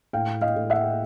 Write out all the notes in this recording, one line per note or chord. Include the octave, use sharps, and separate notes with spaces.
A2 F5 G5
D#5 F5
A2
E5 F#5